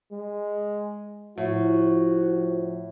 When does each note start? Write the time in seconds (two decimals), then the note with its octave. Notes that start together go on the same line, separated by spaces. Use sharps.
0.11 G#3
1.38 A2 F3 F#4